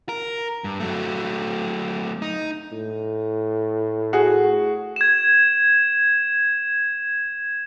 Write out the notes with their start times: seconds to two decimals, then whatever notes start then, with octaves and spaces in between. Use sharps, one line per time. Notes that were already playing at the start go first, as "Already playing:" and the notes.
0.09 A#4
0.64 G2
0.80 F#3 A3
2.22 D#4
2.72 A2
4.13 F#4 G#4
4.96 G#6 E7